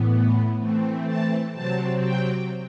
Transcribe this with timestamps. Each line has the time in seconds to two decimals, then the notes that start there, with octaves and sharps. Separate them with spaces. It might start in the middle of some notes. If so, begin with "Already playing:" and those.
Already playing: A2 E3 B3
0.58 E3 A3 C4
1.06 A5
1.53 C3 F#3 C4 A5
2.01 G5